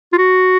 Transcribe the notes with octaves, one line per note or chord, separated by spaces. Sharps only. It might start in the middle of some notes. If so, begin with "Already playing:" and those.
F4
F#4